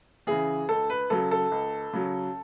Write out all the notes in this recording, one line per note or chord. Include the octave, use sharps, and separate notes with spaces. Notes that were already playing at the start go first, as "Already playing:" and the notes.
C#3 E3 G#4
C#2 A4
B4
C#3 F#3 A4
A4
C#2
C#3 F#3